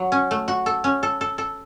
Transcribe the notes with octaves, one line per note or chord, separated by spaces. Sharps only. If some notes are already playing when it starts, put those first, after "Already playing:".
Already playing: F#3
C#4
A3
F#4
A4
C#4
A4
A4
A4